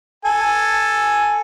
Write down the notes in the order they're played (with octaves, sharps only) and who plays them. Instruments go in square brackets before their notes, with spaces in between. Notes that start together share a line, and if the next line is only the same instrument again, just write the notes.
[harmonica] A4 G#5